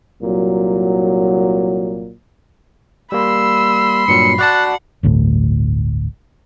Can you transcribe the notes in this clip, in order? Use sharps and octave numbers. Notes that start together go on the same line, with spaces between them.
C2 A#2 F#3
G3 A#3 B5 C6 E6
G2 A#2 F#3 C#7
F#4 D5 F#5 A5 F#6
G1 D2 A2